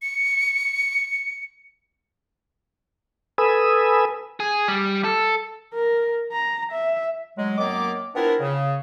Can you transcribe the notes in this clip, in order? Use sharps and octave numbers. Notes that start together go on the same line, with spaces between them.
C#7
A4 B4 G#5 B5 D#6 E6
G#4
G3
A4
A#4
A#5
E5
F#3 G#3
F#2 D#3 F#3 A#3 B3 D6
B3 C4 D4 E4 F4 A#4
C#3